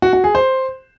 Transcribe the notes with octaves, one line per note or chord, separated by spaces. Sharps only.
F#4
F#4
G#4
C5